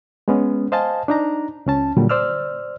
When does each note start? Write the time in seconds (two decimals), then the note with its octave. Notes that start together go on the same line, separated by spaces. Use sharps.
0.28 G#3 B3 C#4
0.72 C5 D#5 F5 G#5 A5
1.08 D4 D#4 A#5
1.66 C#2 C#4 A5
1.97 A#2 D3 F#3 G3
2.09 C5 D5 E6 F6